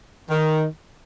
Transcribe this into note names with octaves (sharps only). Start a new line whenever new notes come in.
D#3